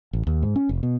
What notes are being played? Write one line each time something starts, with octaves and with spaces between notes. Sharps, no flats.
A1
D#2
G#2
C#4
F1
B2